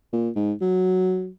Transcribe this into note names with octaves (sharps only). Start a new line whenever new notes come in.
A#2
G#2
F#3